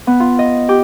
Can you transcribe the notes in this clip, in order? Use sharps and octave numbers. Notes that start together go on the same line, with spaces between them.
B3
F4
D#5
G4